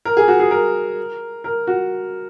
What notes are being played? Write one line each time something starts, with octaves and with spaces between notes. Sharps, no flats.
A#4
G#4
F#4
G#4
A#4
A#4
F#4